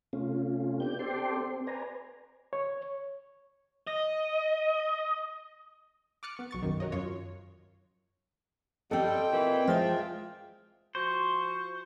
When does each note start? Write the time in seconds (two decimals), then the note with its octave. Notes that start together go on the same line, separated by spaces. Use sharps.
0.13 C3 A3 C#4 F4
0.80 B3 D4 G4 G6
0.99 C4 G4 A4 D5 G5 C6
1.41 C4
1.67 B4 C5 D5 G#5 A#5
2.53 C#5
3.87 D#5
6.23 D6 D#6 F6 F#6 A6 C#7
6.37 B3 C#6
6.51 B1 C#6 A6
6.62 B1 F#2 D#3
6.80 F#4 A#4 C#5 D#5
6.92 F#2 F4 C#5
8.91 G3 C4 A4 D#5 G5
9.32 A#2 E3
9.67 F3 G#3 F4 E5
10.95 F3 F#4 C5 C#6